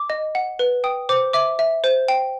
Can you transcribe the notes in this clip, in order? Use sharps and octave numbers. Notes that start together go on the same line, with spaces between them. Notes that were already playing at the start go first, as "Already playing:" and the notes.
Already playing: D6
D#5
F#5
B4
G5 D#6
C5 D6
E5 D6
E5
C5
G5